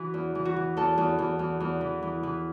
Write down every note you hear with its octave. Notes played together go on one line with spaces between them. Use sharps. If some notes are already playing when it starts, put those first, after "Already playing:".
Already playing: E3 F#4
E2
E3
F#4
E3
E2 A4
E2
E2
E2
E2
E3
E3
E3